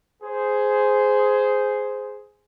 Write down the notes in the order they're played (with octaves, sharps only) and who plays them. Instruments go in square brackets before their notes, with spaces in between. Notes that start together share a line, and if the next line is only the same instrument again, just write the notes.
[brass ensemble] G#4 C5